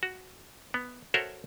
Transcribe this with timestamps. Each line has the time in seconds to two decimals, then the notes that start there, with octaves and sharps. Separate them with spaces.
0.03 F#4
0.74 B3
1.14 F#4 A4 A#4 C5 C#5 E5